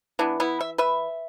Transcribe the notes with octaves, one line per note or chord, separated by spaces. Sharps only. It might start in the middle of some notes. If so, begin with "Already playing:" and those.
E3 B3 D4
B3 E4
E5
B4 E5